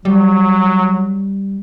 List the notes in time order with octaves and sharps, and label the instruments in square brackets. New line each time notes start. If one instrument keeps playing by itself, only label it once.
[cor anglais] F#3 [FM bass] G3